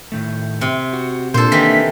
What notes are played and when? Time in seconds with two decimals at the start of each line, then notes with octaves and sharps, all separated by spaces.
0.12 A2 D#3 A3
0.61 C3
0.93 F#4
1.34 A#2 A#3 D4 A4 C5
1.52 D#3 E3 B6